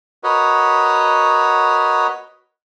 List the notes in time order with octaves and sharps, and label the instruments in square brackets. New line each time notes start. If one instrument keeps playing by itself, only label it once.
[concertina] F#4 A#4 B4 C#5 D#5